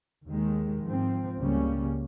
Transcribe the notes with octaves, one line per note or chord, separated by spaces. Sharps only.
D#2 D#3 G#3
G#2 F3 C4
C#2 C#3 G3 A#3 C#4